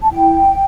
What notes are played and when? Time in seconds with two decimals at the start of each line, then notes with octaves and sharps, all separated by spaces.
0.03 A5
0.10 E4 G5